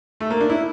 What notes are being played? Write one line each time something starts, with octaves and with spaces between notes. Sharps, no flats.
A3
A#3
D4
E4